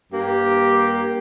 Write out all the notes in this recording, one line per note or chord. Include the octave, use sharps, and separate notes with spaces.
G2 A#3 G4